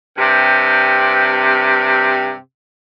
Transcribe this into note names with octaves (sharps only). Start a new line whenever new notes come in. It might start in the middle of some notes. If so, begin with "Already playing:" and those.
G2 C3